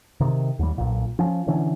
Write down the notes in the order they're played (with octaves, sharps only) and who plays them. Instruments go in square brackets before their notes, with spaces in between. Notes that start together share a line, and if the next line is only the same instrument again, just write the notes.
[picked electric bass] C3 D#3
D#2 G3
B1 A#2
F3 C#4
B2 D3 E3 C#4